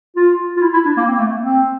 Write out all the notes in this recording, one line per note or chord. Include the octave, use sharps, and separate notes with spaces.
F4
F4
E4
E4
D4
A#3
C4
A#3
A3
A#3
C4